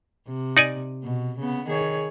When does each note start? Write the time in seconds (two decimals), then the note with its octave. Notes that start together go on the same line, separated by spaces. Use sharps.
0.28 C3
0.57 D#4 D5 G#5
1.04 B2
1.38 C#3 B3
1.67 D#3 G#4 C#5